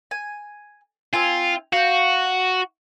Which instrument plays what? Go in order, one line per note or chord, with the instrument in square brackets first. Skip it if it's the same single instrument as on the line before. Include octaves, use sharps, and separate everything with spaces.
[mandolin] G#5
[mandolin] C4 G#5 [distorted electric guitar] F4
[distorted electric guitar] F#4 [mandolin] F5 G6